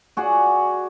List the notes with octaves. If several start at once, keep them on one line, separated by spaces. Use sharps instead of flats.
F#4 G#4 D5 F#5